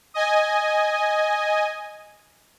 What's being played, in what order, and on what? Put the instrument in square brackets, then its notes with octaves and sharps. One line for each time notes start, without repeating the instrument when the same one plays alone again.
[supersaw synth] D#5 G#5